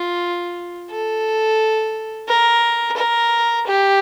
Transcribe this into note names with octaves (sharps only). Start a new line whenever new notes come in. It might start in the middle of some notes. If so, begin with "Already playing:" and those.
Already playing: F4
A4
A#4
A#4
G4